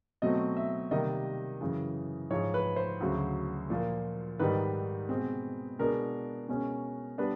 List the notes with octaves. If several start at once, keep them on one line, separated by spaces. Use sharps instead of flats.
B2 F#3 A3 C4 D#5
E5
C3 D#3 G3 A#3 D#5
F#2 C#3 E3
G#2 F3 G#3 C#5
B4
C5
D2 C#3 F#3
A#2 F3 A#3
G#2 D#3 G3 B4
B2 G#3 C4
B2 G#3 B3 D4 A#4
B2 G#3 C#4
G3 B3 D4 B4